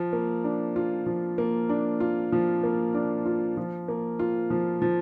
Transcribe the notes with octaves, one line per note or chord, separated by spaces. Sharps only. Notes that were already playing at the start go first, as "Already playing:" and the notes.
Already playing: F3
A#3
D4
F4
F3
A#3
D4
F4
F3
A#3
D4
F4
F3
A#3
F4
F3
F3